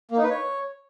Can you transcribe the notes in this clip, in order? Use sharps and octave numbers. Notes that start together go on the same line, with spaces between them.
A#3
D#4
B4
C#5